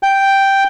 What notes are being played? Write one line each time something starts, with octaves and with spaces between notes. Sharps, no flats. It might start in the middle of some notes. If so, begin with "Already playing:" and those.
G5